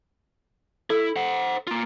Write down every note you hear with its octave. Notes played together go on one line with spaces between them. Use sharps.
E4 A4
C5 F#5
A#3 F4